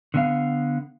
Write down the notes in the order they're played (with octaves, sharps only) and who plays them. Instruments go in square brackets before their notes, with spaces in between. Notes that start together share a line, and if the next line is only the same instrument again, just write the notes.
[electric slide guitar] D3 B3 F5